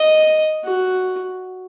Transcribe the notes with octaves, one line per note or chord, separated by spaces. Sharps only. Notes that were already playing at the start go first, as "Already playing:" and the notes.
Already playing: D#5
F#4